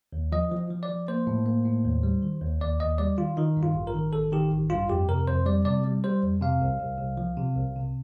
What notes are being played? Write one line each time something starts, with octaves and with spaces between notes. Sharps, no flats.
D#2
F3 D#5
F3
F3
D5
F3
A#3 C5
A2
A#3
A2
D#2
G3
D#3
D#2
D#2 D5
D#2 D#5
G3 D5
D#3 F4
D#3 D#4
G2
F4
A1
A#4
D#3
A1 A4
D#3 G4
A1
G2 F4
F2 G4
C3 A#4
F2 C5
G3 D5
C3 D5
G3
G3 C5
F2
C3 F5
C2
C2
C2
F3
C3
C2
C3